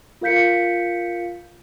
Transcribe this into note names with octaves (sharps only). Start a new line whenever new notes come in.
F4 A#4 F5 G6 B6 C#7